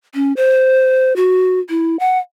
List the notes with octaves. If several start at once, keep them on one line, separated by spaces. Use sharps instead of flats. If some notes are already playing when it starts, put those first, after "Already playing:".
C#4
C5
F#4
E4
F#5